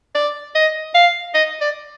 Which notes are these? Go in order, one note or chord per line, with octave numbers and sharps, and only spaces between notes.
D5
D#5
F5
D#5
D5